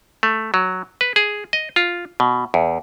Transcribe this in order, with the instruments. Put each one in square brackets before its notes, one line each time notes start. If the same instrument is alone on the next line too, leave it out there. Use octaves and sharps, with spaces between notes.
[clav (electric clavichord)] A3
F#3
B4
G#4
D#5
F4
B2
E2